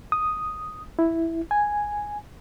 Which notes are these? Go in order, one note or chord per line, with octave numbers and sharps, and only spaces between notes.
D#6
E4
G#5